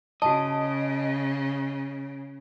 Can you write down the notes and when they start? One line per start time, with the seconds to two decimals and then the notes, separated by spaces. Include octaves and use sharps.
0.22 C#3 F#4 D#5 A5